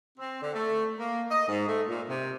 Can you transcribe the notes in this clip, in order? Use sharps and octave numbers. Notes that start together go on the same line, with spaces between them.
C4
D3
A3
A#3
D#5
G#2
A3
A#2
C3